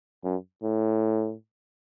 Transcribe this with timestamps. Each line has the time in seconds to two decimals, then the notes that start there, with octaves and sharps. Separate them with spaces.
0.24 F#2
0.63 A2